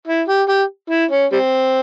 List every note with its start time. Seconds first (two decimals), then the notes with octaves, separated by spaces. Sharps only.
0.08 E4
0.28 G4
0.49 G4
0.90 E4
1.11 C#4
1.32 G3 C4